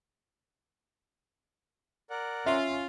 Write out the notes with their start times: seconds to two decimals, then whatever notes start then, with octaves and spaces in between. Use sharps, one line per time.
2.10 A#4 D5 F#5
2.46 C#4 F4 E5